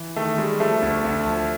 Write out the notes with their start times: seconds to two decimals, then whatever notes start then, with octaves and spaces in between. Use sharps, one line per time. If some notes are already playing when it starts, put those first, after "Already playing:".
Already playing: E3
0.16 D#3 A3
0.38 G3 G#3
0.60 F3 A3
0.82 D2
1.04 D2
1.27 F3